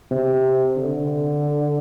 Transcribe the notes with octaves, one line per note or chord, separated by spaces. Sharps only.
C3
D3